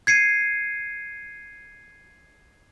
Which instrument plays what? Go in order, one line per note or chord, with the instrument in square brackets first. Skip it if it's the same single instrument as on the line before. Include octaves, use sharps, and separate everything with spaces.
[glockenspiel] G#6 C7 C#7 D#7